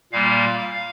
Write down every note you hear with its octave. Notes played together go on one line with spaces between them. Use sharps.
A#2 G3 A#3 F5
F5